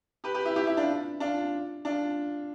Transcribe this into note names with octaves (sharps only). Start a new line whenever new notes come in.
G4 B4
G4 B4
E4 G4
E4 G4
E4 G4
D4 F4
D4 F4
D4 F4